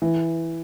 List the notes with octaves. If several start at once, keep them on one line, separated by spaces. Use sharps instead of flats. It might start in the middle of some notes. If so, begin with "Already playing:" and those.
E3